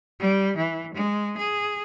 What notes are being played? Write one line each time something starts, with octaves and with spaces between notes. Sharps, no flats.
G3
E3
G#3
G#4